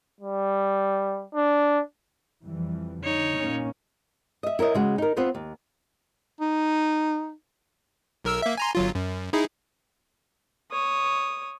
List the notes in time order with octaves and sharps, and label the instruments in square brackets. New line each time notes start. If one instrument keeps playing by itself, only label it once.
[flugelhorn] G3
D4
[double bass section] F2 E3 G3
[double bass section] D3 [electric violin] D#4 C#5
[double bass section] A#2 A#3 C#4
[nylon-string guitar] D#5 E5
E4 A#4 C#5 D#5
C#3 G#3 F#4
D#4 A#4
B3 C4 F4 C5
D#2
[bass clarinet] D#4
[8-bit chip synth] B1 A#4 E6
A#3 E5
G#5 A#5 C6
G1 F#3 F4
F#2
D#4 E4 G#4
[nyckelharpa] C#5 D#6